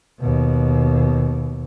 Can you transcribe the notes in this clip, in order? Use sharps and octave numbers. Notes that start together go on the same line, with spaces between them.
D#2 B2